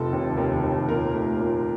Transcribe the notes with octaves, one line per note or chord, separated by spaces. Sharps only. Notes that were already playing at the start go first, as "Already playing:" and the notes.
Already playing: F1 F3 A4
D#2
D#2 A#4
D#2
A#2 A#4
A3
A#2